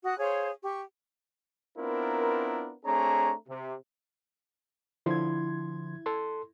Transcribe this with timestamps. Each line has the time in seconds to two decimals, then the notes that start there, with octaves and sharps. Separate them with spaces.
0.05 F#4 D#6 F#6
0.19 G#4 C5 C#5 F5
0.63 G4 C#6
1.78 B3 C4 D4 E4 F4 A#4
2.86 A3 C4 D4 G#4 C#5 A#5
3.49 C3
5.06 D3 F3 E4 C6 G#6
6.06 A4 C6